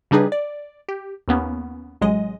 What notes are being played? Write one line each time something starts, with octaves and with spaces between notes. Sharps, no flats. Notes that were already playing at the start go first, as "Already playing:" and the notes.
C#3 G3 D4 D#4 G#4 B4
D5
G4
D#2 A#3 B3 C#4
A1 F#3 G#3 D#5